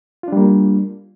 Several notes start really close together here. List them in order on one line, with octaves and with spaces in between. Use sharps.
F4 D4 G3 A#3